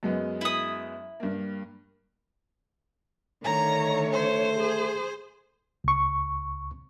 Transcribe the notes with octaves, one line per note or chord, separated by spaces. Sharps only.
F#2 G#3 B3
E4 D#6
G2 A#3
D3 D#3 A3 C#5 A#5
C5
G#4
C#2 C#6